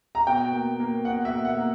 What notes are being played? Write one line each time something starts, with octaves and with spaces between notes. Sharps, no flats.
A#5
B2 G5
A#3
A#3
B2 F#5
E5
A#3
F#5
A#3